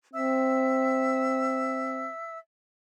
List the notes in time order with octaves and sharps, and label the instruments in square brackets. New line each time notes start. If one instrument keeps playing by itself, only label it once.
[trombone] C4 [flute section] E5 E6